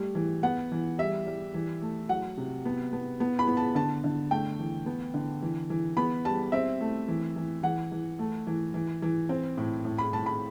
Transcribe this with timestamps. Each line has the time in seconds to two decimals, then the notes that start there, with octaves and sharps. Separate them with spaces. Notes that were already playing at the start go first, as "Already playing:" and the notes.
Already playing: G3 A3
0.15 E3
0.43 B3 F#5
0.72 E3
0.98 G3 E5
1.27 G3
1.54 E3
1.82 A3
2.09 F#3 F#5
2.37 C3
2.65 B3
2.93 B3
3.20 B3
3.39 B5
3.47 B3
3.57 A5
3.75 D3 A5
4.04 D3
4.31 A3 G5
4.59 E3
4.86 B3
5.14 D3
5.42 E3
5.70 E3
5.97 B3 B5
6.25 G3 A5
6.52 C4 E5
6.81 A3
7.08 E3
7.36 E3
7.63 E3 F#5
7.92 E3
8.19 A3
8.47 E3
8.74 E3
9.02 E3
9.29 C4
9.58 A2
9.85 A2
9.98 B5
10.13 A2 A5
10.26 B5